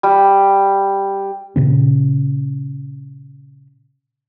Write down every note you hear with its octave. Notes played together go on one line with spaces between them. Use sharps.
G3
A#2 C#3 C#4